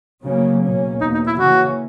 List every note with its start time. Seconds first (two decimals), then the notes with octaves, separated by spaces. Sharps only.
0.25 C#3 F#3 A#3 C#4
0.63 B2 A#3 C#4
1.01 E2 B2 A#3 D#4
1.14 D#4
1.27 E4
1.39 C#3 E3 A#3 C#4 F#4